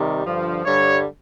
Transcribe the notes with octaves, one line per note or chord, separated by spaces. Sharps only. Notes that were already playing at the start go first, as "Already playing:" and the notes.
Already playing: C3 D#3 G3
G2 D3 F3
G2 D3 G3 C#5